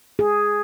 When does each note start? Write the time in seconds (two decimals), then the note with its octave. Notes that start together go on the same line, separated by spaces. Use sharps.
0.19 G#4